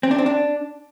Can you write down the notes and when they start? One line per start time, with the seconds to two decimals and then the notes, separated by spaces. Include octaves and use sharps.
0.03 C4
0.11 D4
0.18 C4
0.26 D4